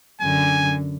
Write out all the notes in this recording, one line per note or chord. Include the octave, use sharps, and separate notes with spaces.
F#2 D3 G#5